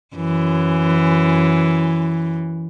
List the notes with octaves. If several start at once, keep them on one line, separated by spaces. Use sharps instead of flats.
F#2 E3